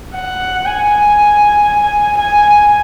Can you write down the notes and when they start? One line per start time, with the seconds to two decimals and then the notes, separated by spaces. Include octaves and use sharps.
0.15 F#5
0.66 G#5
2.18 G#5